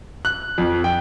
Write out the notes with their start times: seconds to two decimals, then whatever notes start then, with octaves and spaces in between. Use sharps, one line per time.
0.25 F#6
0.58 F2
0.84 G5